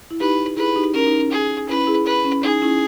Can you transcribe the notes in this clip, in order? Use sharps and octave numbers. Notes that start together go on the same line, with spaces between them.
E4
D#4 G4 B4
E4 G#4 B4
D#4 G4
C#4 A#4
D#4
C#4
G#4
C#4 E4 B4
E4 G#4
B4
C#4
D#4 G#4
C#4 E4